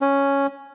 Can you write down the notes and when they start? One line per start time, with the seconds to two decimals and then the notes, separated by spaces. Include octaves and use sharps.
0.02 C#4